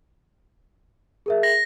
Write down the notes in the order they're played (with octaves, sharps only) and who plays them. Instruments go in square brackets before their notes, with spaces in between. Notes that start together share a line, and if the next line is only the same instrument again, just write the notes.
[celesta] G#4 A#4 E5
[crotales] A#6